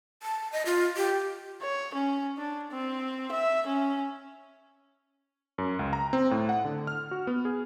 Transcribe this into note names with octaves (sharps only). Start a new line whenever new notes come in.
A5
D#5
F4
G4
C#5
C#4
D4
C4
E5
C#4
F#2
C#2
A#5
C4
A2
F#5
D3
F6
F#4
B3
G#4